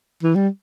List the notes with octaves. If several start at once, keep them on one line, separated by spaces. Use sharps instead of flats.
E3
G3